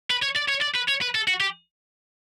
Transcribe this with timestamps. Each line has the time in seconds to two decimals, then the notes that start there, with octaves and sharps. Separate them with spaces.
0.11 B4
0.23 C#5
0.36 D5
0.49 C#5
0.62 D5
0.76 B4
0.89 C#5
1.02 B4
1.15 A4
1.28 F#4
1.40 G4